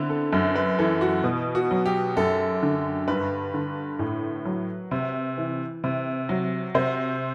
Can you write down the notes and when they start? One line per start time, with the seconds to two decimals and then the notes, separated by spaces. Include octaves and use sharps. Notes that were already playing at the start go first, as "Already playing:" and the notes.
Already playing: D3 B3 C4 E4
0.10 A4
0.33 F#2
0.56 B4
0.78 E3 A4
1.01 F#4
1.24 B2
1.55 F#4
1.71 F#3
1.86 G4
2.17 F#2 A4
2.62 D3
3.08 G2 B4
3.54 D3
3.99 A2
4.45 F#3
4.91 C3
5.38 E3
5.84 C3
6.29 F#3
6.75 C3 C5